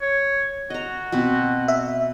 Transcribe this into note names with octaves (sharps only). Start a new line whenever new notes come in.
C#5
F#4 D#5 A#5
B2 C4 B4
E5